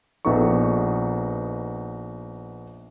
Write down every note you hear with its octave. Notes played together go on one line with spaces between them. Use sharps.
A#1 B3 D#4 A4 C#6